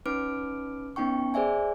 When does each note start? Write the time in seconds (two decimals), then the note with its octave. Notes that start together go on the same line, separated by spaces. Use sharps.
0.06 C#4 D#4 B4 D6 F6 D7
0.96 B3 C#4 D#4 G5 C#6
1.34 G#4 C5 D5 E5 G#5